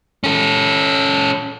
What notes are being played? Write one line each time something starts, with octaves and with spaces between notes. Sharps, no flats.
C#4 A4